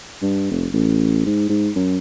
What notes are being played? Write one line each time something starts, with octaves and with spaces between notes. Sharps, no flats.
G2
F1
A1
G#2
G#2
F#2